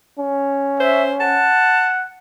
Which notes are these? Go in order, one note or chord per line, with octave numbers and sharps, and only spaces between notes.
C#4
C5 E5
F#5 A5